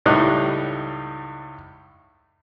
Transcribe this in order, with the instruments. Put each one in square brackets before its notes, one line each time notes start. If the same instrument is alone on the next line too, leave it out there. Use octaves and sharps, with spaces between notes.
[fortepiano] C#2 A2 G3 D#4 F#6